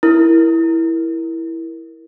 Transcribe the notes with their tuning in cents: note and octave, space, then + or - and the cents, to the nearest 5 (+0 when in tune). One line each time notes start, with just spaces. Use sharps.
E4 +0 A#4 +5